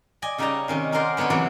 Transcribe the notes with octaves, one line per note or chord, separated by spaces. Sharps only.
D5 D#5 G#5
C#3 G3 D#4 G4 A5 A#5
C3 D#3 C#4
C#4 D#4 F#4 A#4 C5 D5
D3 B3 D#4 A4 C#5
C3 E3 F#3 A#3 A4